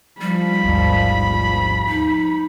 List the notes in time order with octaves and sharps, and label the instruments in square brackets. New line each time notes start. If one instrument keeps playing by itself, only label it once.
[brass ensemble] F3 [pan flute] G3 [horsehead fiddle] B5
[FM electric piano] A1 D#2 G#2
[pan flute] D#4